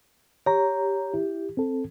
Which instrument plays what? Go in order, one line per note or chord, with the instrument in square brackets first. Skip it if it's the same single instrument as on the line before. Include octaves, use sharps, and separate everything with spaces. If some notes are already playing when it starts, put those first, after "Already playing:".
[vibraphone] G4 [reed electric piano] C#5 A#5
[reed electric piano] E4
C4 A4